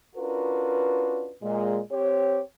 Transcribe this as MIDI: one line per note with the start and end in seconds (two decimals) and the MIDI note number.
0.16 1.32 61
0.16 1.32 62
0.16 1.32 65
0.16 1.32 66
0.16 1.32 70
0.16 1.32 71
1.42 1.79 46
1.42 1.79 56
1.91 2.40 60
1.91 2.40 67
1.91 2.40 73